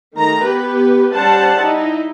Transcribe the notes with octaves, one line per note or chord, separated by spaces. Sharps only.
D#3 A3 A#5
B3 G4 B4
G3 C#4 C5 F#5 A5
D#4 E4